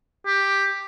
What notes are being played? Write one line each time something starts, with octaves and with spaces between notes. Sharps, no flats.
G4